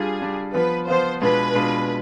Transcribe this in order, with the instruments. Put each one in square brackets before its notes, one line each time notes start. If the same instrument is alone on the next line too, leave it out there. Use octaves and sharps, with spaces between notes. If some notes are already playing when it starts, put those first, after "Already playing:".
Already playing: [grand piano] G3 D4 F4 [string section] G#4
[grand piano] G3 D4 F4
[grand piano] F3 B3 F4 [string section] B4
[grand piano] F3 B3 F4 [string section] C5
[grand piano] B2 G#3 D4 F4 [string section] B4
[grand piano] B2 G#3 D4 F4